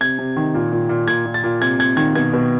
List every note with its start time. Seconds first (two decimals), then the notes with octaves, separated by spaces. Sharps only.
0.01 C3 G#6
0.19 C3
0.36 D#3
0.54 A#2
0.72 A#2
0.89 A#2
1.08 A#2 G#6
1.26 A#2
1.34 A6
1.44 A#2
1.61 C3 G#6
1.79 C3 G#6
1.97 D#3 G#6
2.15 B2 G#6
2.34 B2